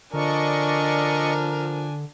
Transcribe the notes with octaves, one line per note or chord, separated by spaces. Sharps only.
D3 F3 D4 A#4 D5 D#5 G#5 C#6